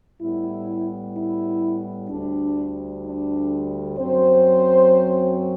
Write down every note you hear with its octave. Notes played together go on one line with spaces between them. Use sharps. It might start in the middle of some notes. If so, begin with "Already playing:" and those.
A2 G3 B3 E4
E4
D2 D3 G3 D4
D4
F#2 F#3 C4 C5